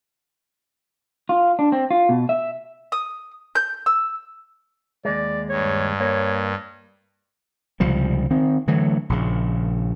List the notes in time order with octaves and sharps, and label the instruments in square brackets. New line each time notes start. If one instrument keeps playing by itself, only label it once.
[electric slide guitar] F4
D4
C4
F4
B2
E5
[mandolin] D#6
G6
E6
[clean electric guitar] D#2 G#3 [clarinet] D5
[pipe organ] G2 [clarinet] C#5
[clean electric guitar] A#3 [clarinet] C#5
[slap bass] C#2 C3 F3 G3
D#3 C4
D3 E3 F#3 A3
A#1 C#3